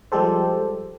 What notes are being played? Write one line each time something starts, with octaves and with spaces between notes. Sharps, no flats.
F3 G3 G#3 G4 A4 C5